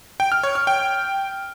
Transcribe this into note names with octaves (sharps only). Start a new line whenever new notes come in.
G5
F6
C#5
F6
G5